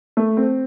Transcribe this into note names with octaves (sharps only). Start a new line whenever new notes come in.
A3
C4